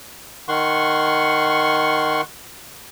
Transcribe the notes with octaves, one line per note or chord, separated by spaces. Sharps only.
D#3 F#5 C6 C#6